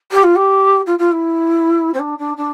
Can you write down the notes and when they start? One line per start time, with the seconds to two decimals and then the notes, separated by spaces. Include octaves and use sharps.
0.11 G4
0.23 F4
0.35 G4
0.86 F4
0.98 F4
1.11 E4
1.94 C4
1.99 D4
2.18 D4
2.37 D4